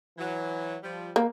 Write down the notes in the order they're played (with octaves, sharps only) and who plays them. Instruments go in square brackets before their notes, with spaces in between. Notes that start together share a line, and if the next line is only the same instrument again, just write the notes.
[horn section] E3 F#3
F3 G3
[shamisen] A#3